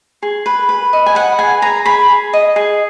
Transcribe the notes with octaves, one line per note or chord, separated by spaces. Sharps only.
G#4
B4
B4
D#5
G#5
B4 F#5
G#4 G#5
G#4 A#5
G#4 B5
G#4
D#5
G#4